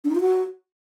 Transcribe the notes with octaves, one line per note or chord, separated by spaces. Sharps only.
D4
D#4
F4
F#4